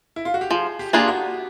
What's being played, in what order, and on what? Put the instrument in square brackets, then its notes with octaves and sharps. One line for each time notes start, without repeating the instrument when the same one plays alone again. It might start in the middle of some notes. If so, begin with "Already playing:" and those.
[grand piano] E4
F4
F#4
G4
[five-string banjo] F3 [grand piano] G#4
[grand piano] G4
[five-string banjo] A#3 D4 F4 G#4 [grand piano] G4
[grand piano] F#4